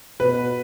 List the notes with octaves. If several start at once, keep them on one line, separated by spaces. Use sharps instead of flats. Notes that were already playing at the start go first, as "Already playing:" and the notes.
B2 B4